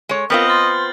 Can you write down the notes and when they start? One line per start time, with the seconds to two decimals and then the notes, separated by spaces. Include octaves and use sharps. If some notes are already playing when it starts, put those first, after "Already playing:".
0.09 G#3 C#5
0.30 B3 C4 F4 A#4 D#5 F6 G6 F#7
0.48 C6 F6 A6